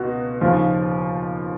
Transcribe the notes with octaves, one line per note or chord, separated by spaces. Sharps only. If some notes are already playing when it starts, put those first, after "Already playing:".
Already playing: C#2 B2 F#4
D#2 C#3 F3 F4